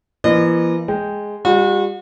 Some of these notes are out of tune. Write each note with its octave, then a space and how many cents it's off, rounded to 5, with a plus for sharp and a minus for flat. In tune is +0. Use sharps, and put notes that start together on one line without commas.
E3 +35 A#3 +40 D#5 -35
G#3 +0 G5 +0
G3 +30 F#4 -35